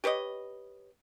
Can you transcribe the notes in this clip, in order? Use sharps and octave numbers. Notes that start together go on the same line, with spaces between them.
G4 B4 C#5 D#5